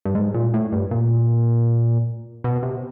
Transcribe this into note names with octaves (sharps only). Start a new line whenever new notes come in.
G2
G#2
A#2
A2
G2
A#2
B2
C3